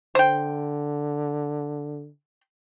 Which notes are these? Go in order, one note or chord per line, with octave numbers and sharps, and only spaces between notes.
D3 C5 G5